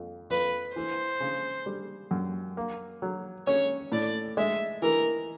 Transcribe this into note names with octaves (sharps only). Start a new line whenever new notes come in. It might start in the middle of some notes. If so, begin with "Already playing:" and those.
Already playing: F2
F2 B4
E3 C5
C#3
G3
F#2
A#3
F#3
C#4 C#5
A2 D5
G#3 E5
E3 A#4